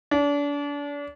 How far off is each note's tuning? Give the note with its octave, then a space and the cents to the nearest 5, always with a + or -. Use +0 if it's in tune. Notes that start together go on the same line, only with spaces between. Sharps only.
D4 -35